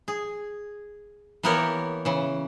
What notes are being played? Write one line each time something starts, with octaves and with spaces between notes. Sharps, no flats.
G#4
E3 A#3 B3 G4 A#4 C#5
C#3 E3